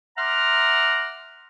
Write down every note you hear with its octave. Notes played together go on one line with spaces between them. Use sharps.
E5 F#5 A#5 C6 D6 F6